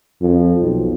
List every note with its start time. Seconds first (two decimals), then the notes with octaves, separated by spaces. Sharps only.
0.21 F2
0.61 B1